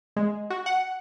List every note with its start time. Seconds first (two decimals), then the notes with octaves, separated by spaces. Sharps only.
0.16 G#3
0.50 F#4
0.66 F#5